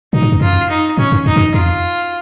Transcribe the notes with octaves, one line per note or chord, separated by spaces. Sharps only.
A#2 D#4
A2
F2
F#2 F4
D#4
A2 C#4
F#2
F2 D#4
A2
F#2
F2 F4